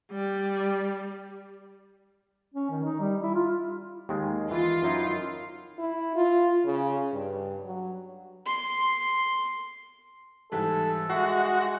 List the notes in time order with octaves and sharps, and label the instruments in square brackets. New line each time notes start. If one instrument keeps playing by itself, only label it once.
[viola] G3
[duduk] C#4
D#3
D#4
G3
E4
F4
[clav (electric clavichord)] D#2 D#3 G#3
[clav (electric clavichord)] E3 [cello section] F4
[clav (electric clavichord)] F#2 D#4 E4
[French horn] E4
F4
C#3
G2
F#3
[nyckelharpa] C6
[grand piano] G#2 E3 G3 [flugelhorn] A4
[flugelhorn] G#3 [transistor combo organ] F#4 [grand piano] E5 C#6 C7